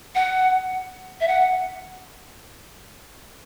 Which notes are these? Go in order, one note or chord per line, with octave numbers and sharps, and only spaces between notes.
F#5
E5
F#5